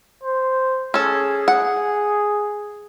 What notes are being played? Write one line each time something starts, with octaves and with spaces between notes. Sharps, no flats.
C5
C#4 G#4 A4
F#5